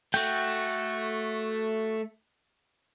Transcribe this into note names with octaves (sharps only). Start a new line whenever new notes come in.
A3 F#4 G5